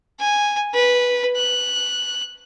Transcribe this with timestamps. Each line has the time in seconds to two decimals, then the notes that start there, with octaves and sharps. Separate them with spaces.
0.19 G#5
0.74 B4
1.36 F#6